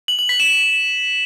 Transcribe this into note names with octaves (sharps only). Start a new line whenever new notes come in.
F#7
F#7
B6
E7